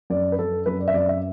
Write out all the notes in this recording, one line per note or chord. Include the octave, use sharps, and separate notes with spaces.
F#2 D5
B4
F#2 A4
F#2 B4
D5
E5
F#2 D5
E5